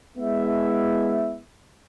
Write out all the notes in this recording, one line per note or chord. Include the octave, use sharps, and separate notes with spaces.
G#3 B3 E4 E5